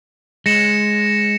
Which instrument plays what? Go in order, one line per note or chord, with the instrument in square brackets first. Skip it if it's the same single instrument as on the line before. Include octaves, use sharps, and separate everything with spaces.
[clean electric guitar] G#3 [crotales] A#6 C#7 E7